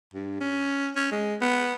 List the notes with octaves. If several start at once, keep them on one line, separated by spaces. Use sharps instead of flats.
G2
C#4
C#4
G#3
B3